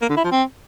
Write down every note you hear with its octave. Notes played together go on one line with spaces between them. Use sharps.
A#3
D3
E4
F3
C4